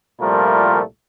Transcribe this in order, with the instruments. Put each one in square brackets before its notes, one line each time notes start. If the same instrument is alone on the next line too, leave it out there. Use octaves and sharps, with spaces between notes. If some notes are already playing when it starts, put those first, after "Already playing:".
[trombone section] C2 A#2 F3 G3 A3 A#4